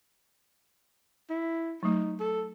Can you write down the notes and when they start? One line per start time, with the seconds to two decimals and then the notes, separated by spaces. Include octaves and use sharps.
1.30 E4
1.83 F#3 A3 D#4
2.20 A4